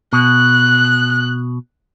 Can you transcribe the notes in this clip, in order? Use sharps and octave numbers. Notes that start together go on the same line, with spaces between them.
B2 F#6